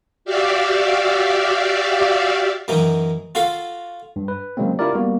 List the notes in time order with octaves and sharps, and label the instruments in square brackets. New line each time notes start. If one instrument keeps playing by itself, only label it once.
[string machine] F#4 G4 D5 E5 F5
[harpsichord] F#2 E3 F#3 D#4
F4 F#4 A4 F5
[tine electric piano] G2
B4
C#3 F#3 G#3 A#3 C4
D4 E4 F4 G4 A#4 D5
G3 A#3 B3 F#4